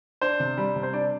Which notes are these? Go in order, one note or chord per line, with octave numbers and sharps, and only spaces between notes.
D4 C5
C3
G3
C3
C5
D4 D5